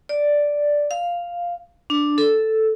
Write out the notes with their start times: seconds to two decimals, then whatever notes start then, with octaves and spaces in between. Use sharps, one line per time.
0.09 D5
0.91 F5
1.90 D4
2.18 A4